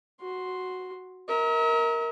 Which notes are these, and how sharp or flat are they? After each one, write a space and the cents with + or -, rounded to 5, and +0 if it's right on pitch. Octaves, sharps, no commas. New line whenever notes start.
F#4 +0 C6 +0
A#4 +0 E5 -45